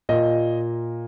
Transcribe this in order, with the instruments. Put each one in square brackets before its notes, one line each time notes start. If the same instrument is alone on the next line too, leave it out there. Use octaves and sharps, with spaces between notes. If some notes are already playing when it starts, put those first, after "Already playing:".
[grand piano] A#2 D#5